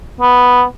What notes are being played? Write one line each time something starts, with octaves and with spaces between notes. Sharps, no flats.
B3